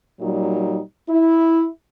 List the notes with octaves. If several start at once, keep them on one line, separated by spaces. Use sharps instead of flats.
A#2 F#3 G3 D#4
E4